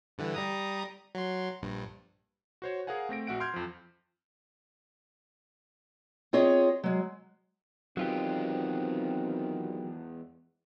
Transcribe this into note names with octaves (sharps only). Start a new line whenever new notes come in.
G2 D3 E3
G3 A#5 D#6
F#3 C6
A#1 G2
F#4 C5 C#5
G#4 A#4 F5 F#5 G#5
A3 C4 A#6 D7
A#1 F#4 E5 F#5 D7
C6 F6 G6 G#6
F2 F3
C4 F4 G#4 C#5 D#5
F#3 G#3
E2 D#3 F#3 G#3 B3 C4 F4 G4